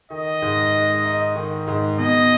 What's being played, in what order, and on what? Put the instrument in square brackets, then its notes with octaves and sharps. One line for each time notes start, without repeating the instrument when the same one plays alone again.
[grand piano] D#3 [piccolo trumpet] D#5
[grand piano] G#2
G#3
D#4
D#3
G#2
[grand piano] B2 [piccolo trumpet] D#5